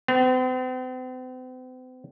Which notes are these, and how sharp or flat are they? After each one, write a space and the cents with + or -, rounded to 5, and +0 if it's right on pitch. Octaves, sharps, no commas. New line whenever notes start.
C4 -45